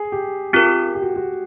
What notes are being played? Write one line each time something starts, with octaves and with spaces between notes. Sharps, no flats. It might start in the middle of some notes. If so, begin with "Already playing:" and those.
Already playing: G#4
G4
C4 F4 G4 A#4
G4
F#4
F#4